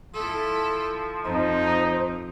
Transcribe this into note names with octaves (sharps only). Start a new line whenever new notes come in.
F3 E4 A4
F2 D#4 C5